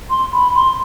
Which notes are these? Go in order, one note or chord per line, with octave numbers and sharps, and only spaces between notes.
C6
B5
C6